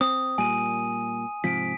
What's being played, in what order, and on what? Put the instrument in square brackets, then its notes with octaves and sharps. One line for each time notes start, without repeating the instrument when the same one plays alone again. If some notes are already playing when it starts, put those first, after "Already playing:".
[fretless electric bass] C4 [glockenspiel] D#6
[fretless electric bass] A#2 G3 [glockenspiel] G#5 D#7
[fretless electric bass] G#2 C3 F3 [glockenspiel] B6 D7